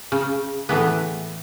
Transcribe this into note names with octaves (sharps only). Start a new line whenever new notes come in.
C#3
A2 E3 B3